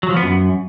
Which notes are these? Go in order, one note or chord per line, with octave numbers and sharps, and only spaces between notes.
F#3
F3
B3
F#2